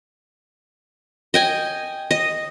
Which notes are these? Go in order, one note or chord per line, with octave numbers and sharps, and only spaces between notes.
D#5 G5 G#5
D#5